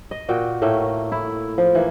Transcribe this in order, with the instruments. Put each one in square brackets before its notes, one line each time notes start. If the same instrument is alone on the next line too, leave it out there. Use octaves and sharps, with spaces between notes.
[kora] D#5
A#2 F#4 G5
A2 A3 A#3
E4
F3
E3 A#3